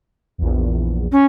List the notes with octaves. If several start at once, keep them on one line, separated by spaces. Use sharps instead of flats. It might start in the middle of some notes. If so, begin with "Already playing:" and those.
A#1 E2
C#4